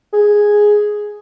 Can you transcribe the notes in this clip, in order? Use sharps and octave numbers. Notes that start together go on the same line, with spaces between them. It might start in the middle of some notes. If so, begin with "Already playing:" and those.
G#4